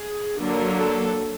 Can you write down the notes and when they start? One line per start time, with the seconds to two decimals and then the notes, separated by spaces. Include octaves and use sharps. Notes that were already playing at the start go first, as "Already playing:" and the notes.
Already playing: G#4
0.38 D3 F#3 A#3 D4
0.79 A4